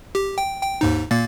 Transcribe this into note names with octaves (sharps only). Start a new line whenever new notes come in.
G4
G5
G5
D#2 G#2 D#4
A#2 A#3 A6